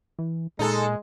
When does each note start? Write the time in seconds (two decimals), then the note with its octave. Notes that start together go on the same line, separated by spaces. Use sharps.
0.19 E3
0.59 A#2 G#3 D#4 A4